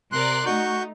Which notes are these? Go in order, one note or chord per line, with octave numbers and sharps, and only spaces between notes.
C3 A#4 D5 C6 F#6
A3 D#4 F#4 C#6 G6